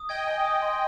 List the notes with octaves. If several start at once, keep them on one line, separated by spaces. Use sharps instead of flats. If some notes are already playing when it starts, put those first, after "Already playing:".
Already playing: D#6
D#5 G5 G#6
G#5
D#6
C6